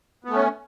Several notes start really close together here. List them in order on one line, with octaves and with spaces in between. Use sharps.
B3 A3 C#4